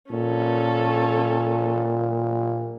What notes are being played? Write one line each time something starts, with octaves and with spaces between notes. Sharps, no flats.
A#2 C#4 A4